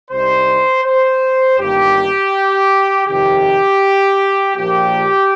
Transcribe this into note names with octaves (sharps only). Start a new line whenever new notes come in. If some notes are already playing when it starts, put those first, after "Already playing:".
C2 C3 G3 D#4 C5
C5
G1 G2 D#3 A#3 G4
F2 C3 D#3 G4
A#1 A#2 F3 A#3 G4